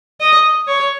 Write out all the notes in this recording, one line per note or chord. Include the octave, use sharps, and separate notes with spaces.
D#5
C#5